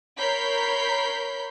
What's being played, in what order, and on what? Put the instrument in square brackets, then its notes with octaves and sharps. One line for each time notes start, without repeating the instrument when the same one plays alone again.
[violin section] A#4 C#5 B5 G6 B6 C7